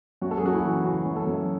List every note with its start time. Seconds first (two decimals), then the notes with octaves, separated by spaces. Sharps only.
0.22 F#2 F#4
0.31 A4
0.38 G#4
0.43 F#2 F#4
0.53 E4
0.63 E3
0.84 C#3 F#4
1.06 F#2
1.16 A4
1.27 F#2